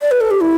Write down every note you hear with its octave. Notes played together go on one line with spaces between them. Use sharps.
D5
B4
A4
G4
E4